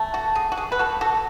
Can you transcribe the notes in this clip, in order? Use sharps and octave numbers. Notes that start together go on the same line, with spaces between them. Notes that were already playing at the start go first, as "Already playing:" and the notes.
Already playing: A3
F#4
G#4
F#4
G#4
B4
F#4 A4
F#4 A4